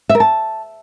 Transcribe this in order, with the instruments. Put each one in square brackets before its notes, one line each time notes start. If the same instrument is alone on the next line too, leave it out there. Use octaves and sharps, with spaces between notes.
[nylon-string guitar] E5
A#4
A5